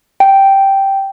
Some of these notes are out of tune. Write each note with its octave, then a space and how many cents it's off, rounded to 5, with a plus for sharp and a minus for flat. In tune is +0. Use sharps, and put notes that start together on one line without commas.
G5 -5